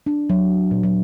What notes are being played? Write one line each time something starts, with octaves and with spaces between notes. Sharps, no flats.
D4
F#3
A#2
F#3